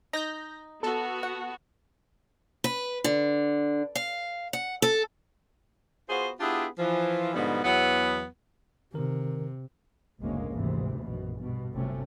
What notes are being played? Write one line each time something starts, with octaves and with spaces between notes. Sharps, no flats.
D#4 G6 A#6
B3 F#4 A4
F#5
B4
D3
F5
F#5
A4
B3 F4 F#4 G#4 C5
B3 D4 E4 F4 G4 G#4
E3 F3
G#2 B2 D3 F3 G3 B3
E2 F#3 B3
C3 D#3 A#4
F#1 D2 G#2 G#3 A#3 C#4
G#1 D2 G#2 C3 E3
A#1 F#2 B2
G2 B2
G1 C3 F#3 A3 C#4